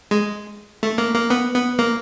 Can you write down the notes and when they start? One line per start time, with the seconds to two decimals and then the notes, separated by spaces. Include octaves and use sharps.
0.11 G#3
0.83 A3
0.98 A#3
1.15 A#3
1.30 B3
1.55 B3
1.79 A#3